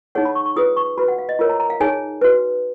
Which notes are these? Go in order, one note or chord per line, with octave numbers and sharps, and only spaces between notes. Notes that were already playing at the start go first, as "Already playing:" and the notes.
D#4 G#4 C#5 F#5
B5
C#6
C#6
F4 G#4 B4 D#6
C#6
F#4 B4 B5
F#5
F5
D#5
F4 A#4 C#5
A#5
A#5
F5
D#4 G#4 C#5 G#5
F#4 B4